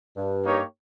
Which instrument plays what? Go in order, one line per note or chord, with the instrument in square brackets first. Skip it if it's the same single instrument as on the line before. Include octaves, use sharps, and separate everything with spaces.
[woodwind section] G2
[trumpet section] A#3 D#4 G4 C#5